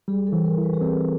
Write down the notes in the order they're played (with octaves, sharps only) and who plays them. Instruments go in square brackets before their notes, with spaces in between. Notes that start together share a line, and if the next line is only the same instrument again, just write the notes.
[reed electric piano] G3 [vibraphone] G#4
[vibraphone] A4
[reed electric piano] E3
[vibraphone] A#4
[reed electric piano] E4
[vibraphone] B4
G4
[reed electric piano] C4 [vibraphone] G#4